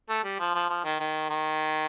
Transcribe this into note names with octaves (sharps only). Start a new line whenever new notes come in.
A3
G3
F3
F3
F3
D#3
D#3
D#3